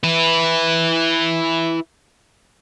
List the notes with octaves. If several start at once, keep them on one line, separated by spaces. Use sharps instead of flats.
E4 B4